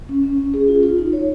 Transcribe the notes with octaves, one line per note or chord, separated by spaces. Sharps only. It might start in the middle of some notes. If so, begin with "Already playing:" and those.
C#4
C#4
C#4
G#4
F4
F4
D#4
C#5